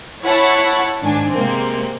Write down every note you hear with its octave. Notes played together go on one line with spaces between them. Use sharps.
E4 C#5 F#5 A5 B5
G#2 D#3 D4 G#5
C3 G#3 A#3 C4